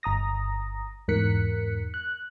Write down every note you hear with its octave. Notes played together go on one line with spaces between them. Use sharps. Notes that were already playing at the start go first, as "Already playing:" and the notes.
G1 A#5 D#6 A#6
E2 G#2 A#4 F#6 B6 C#7
F#6